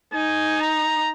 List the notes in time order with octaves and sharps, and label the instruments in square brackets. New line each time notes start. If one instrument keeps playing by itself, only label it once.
[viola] D#4 [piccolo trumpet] G#5
[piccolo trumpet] A#5